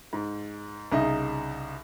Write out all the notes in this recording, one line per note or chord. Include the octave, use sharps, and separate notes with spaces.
G#2
C2 C#3 D#4 E5